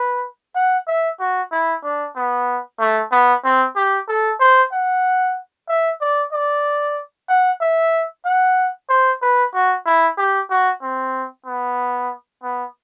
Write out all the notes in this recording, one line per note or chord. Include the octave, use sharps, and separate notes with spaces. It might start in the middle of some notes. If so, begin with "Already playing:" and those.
Already playing: B4
F#5
E5
F#4
E4
D4
B3
A3
B3
C4
G4
A4
C5
F#5
E5
D5
D5
F#5
E5
F#5
C5
B4
F#4
E4
G4
F#4
C4
B3
B3